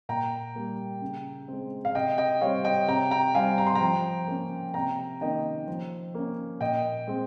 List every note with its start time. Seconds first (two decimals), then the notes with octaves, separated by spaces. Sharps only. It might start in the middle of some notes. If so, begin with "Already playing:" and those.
0.09 A#2 G5 A#5
0.55 G3 A#3
1.02 C#3
1.48 G#3 C4
1.85 F5
1.95 C3 D#5 G5
2.18 D#5 G5
2.41 G3 C4 C#5 F5
2.64 D#5 G5
2.88 C3 G5 A#5
3.11 G5 A#5
3.34 G3 C4 F5 G#5
3.58 A#5
3.67 C6
3.75 G5 A#5
3.81 F3
4.27 A#3 C#4
4.74 C3 G5 A#5
5.21 D#3 A#3 C#4 D#5 G5
5.68 F3
6.15 A#3 C#4
6.60 A#2 D#5 G5
7.07 G#3 C4